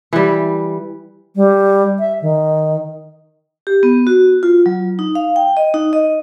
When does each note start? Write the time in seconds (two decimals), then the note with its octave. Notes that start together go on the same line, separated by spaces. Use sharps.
0.13 E3 G3
1.36 G3
1.99 E5
2.22 D#3
3.67 G4
3.83 B3
4.07 F#4
4.43 F4
4.66 F#3
4.99 D#4
5.15 F5
5.36 G5
5.57 D#5
5.74 D#4
5.93 D#5